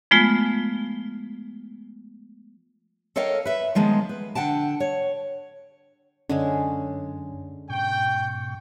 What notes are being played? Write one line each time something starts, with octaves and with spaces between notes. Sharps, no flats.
F3 G#3 A3 B3 F4
A4 A#4 C#5 D#5 F5 G5
B4 E5
D#3 F3 G#3 A#3 B3
B4
D3 F#5 G5 A5
C#5
F#2 D3 G#3 C#4 G#4
G#2 B2 G5 C#6